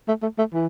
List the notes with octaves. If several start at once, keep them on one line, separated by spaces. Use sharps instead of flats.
A3
A3
A3
E3